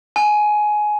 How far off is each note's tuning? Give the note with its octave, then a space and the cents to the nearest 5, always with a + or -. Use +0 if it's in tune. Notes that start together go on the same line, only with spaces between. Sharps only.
G#5 +15